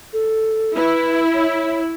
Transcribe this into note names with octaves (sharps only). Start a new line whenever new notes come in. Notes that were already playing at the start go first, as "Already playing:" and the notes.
A4
E4 B4
C#5